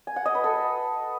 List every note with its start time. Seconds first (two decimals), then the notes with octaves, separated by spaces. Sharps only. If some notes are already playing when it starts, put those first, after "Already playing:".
0.07 G#5
0.16 F#5
0.26 D#5
0.35 B4
0.44 A4